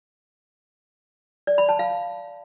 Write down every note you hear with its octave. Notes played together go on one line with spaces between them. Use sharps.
D5
B5
A5
F5